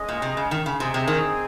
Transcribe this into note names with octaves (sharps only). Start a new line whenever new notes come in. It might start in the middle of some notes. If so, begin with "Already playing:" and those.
Already playing: G#3 C#4 G#4 D#5
A#2
C3
C#3
D#3
C#3
C3 C4 D#4 G#4
C3
D#3